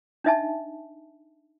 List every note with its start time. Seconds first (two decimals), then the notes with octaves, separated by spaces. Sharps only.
0.24 D4 D#4 D#5 E5 G#5 A5